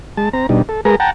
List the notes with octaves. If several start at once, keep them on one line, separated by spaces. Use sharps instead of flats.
G#3 A5
C4 A#5
B2 G3 D4 D#4
A4
G#3 G#4 A#4 B4 A#5
F#5 G5 A5 A#5